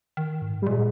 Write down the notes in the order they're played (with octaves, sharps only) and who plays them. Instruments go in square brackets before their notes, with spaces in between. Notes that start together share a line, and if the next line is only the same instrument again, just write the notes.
[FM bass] D#3
G#2
[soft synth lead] G3
[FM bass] A#2 [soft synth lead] G#3